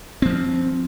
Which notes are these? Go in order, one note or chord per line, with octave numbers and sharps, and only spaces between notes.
F3 C4